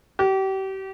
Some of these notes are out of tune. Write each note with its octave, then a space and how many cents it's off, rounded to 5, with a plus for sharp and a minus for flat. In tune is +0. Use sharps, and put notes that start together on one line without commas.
G4 -35